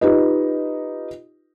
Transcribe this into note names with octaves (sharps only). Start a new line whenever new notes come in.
D#4 F4 G4 B4 D#5